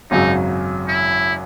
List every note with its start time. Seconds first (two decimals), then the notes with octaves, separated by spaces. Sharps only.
0.11 G#1 F#2 C#3 F#3 D#4
0.88 E4